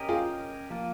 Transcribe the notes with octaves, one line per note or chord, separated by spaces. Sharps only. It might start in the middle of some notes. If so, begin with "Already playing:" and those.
Already playing: C#4 G4 A#4 D#5
F4 G#4
F3 A#3 F4